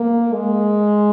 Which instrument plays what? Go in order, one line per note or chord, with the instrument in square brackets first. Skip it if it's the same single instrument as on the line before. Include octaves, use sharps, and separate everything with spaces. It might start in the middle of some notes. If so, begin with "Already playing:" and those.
Already playing: [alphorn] A#3
G#3